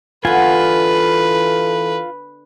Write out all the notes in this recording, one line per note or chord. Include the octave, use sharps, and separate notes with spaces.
D3 E3 B3 F4 A4 B4 G#5